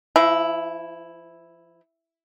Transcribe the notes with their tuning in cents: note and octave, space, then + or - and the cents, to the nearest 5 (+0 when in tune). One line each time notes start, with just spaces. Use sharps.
F3 -40 E4 +0